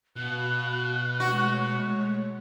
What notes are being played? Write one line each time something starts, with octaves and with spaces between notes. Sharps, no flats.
B2 F#4 F5 F#6
G#3 A3 F#4 C#5